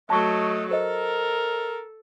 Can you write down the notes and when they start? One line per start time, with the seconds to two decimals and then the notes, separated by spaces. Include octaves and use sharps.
0.10 F#3 A3 D#5 A5 C#6
0.71 A4 A#4 C5 D#5